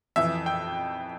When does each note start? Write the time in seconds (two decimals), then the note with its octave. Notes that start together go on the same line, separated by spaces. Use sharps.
0.16 F2 E3 E5
0.46 G5